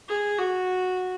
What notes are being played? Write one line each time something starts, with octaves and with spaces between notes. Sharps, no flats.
G#4
F#4